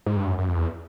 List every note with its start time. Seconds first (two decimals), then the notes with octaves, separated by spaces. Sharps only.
0.06 G#2
0.16 G2
0.27 F#2
0.38 F#2
0.48 F2
0.57 E2